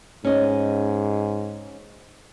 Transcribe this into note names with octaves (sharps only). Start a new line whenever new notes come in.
G#2 C#4 D#5